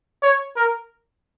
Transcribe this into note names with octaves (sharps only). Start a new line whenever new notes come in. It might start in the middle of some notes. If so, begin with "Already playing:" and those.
C#5
A#4